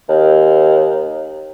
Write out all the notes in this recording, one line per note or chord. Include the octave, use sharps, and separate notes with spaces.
D#2